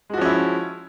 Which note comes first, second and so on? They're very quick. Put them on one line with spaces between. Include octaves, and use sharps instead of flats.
G#3 F#4 F3 C#4 E4